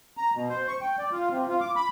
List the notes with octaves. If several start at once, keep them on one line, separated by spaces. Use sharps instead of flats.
A#5
B2
C5
C#6
G5
D5
F4
C3
F4
D6
B5